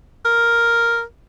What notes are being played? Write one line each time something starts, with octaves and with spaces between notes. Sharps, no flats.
A#4